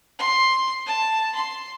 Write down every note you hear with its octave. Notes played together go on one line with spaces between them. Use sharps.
C6
A5
C6